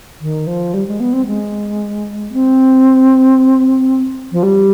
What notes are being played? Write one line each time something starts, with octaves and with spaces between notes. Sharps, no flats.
D#3
F3
G3
G#3
B3
C4
G#3
C4
F3
G3